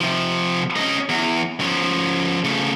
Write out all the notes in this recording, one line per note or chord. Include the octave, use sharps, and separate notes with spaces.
C3 F3
C#4 D#5
E2
F3 C#4
C#3 A3